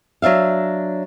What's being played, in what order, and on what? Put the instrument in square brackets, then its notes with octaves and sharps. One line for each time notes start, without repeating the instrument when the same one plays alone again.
[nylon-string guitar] F#3 D4 E5 F5